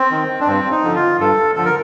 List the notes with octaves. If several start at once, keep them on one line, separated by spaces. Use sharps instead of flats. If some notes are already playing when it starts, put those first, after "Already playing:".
Already playing: C4
D#3
D4
G2 C4
D#4
D3 F3
F4
G2 A4
D3 F3 A4
A#4